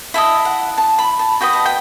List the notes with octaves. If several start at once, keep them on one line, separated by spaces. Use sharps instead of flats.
E4 A4 D#5 E5
F#5
A5
B5
A5
F#4 B4 D#5 G5
A5
G5